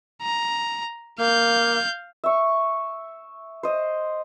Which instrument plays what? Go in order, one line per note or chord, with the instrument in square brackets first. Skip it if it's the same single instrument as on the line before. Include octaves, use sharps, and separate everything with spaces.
[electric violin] A#5
[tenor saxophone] A#3 [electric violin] F5 G6
[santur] E5 C#6
C5 D#5